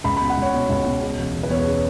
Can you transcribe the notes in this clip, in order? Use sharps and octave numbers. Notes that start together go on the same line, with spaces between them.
C#2 B5
B5
B2
F#5
C#2 C#5
B2
C#2
B2
C#3
E1
E1
B4
E2 C#5
C#3